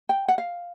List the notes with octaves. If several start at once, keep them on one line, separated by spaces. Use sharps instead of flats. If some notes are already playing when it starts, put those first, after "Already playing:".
G5
F#5
F5